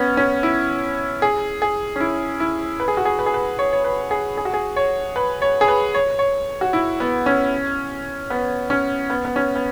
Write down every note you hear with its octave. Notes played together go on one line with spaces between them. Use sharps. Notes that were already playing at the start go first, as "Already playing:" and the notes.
Already playing: B3 C#4
C#4
E4
G#4
G#4
C#4
E4
E4
B4
G#4
F#4
G#4
B4
G#4
B4
C#5
C#5
B4
G#4
G#4
F#4
G#4
C#5
B4
C#5
G#4
B4
C#5
C#5
F#4
E4
B3
C#4
B3
C#4
B3
B3
C#4
B3